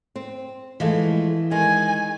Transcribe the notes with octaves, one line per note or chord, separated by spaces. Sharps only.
C4
E3 F3 G#3 A3
D#3 G#3 G#5